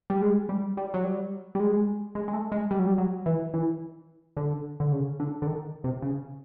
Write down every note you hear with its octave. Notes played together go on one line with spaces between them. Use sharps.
G3
G#3
G3
G3
F#3
G3
G3
G#3
G#3
G#3
A3
G#3
G3
F#3
G3
F#3
E3
E3
D3
D3
C#3
D3
D3
D#3
C3
C#3